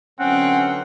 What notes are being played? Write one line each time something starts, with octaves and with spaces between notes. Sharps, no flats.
D3 E3 F#3 C4 C#4 F#5